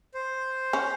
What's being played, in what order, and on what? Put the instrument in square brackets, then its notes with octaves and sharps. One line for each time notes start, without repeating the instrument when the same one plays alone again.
[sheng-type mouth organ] C5
[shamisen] C#4